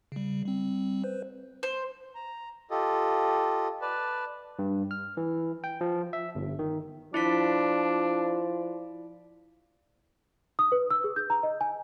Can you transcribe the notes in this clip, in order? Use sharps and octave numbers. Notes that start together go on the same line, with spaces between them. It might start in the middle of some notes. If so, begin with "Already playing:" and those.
C#3 G3
G3 C4
B4 C5
C5
A#5
F4 G4 A4 D#5
B4 D5 A5
G2
F6
E3
G5
F3
E5
G1
D#3
F3 D4 E4 D5 B6
D#6
B4
E6
G#4
G6
A#5
D#5
G#5